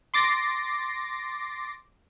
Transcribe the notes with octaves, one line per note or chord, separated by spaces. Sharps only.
C6 D6 A6 A#6 C7